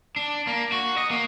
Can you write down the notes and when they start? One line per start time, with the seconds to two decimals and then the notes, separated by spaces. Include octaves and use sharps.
0.16 D4
0.47 A#3
0.72 F#4
0.97 D#5
1.11 A#3